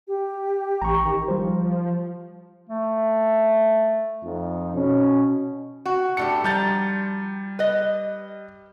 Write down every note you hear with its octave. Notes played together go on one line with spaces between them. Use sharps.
G4
A1 A#5 C#6
D#3
F3 G3 C5
A3
F2 D#4
B2 C#4
F#4
A2 D4 G4 C#7
F3 G3 A#5 G6 A6
B4 D#5